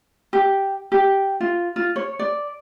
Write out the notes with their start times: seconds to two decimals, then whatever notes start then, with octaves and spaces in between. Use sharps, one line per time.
0.33 G4
0.92 G4
1.40 F4
1.76 F4
1.96 C#5
2.19 D5